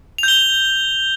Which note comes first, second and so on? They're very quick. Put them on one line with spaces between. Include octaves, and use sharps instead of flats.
F7 G6 G7